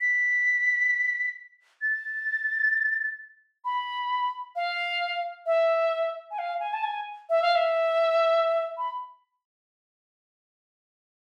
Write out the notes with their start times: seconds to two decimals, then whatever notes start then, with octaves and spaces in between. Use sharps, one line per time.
0.01 B6
1.82 A6
3.65 B5
4.56 F5
5.46 E5
6.31 G#5
6.39 F5
6.60 G#5
6.73 A5
6.84 G#5
7.30 E5
7.42 F5
7.55 E5
8.78 B5